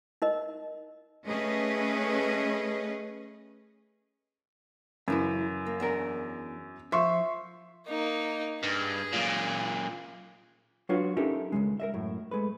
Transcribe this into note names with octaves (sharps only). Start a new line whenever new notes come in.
D#4 A#4 D#5
A3 C#4 G#4 B4 D#5
F#2 C#3 E3 E4
A#3
E2 D4 A#4
F3 E5 C6 C#6
A#3 D#4
G2 G#4
F#2 A#2
F#3 D4 F4 F#4 B4 C#5
C#4 D#4 G4 A4 A#4 E5
C#2 C3 G#3
A#4 D#5 E5
F#2 A2
G#3 A3 B4